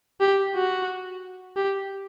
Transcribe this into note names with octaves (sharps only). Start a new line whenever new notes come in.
G4
F#4
G4